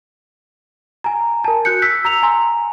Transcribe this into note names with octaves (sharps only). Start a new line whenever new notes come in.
G#5 A#5
A#4 A5
F#4 F#6 G6 C#7
E6 B6
A#5 E6 F7
G#5 A#5 C6